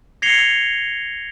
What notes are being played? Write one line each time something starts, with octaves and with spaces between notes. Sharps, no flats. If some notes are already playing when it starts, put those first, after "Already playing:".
G#6 A#6 C7 C#7 F7 G7